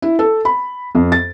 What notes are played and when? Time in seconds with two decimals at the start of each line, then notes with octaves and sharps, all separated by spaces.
0.02 E4
0.19 A4
0.45 B5
0.95 F2
1.12 A6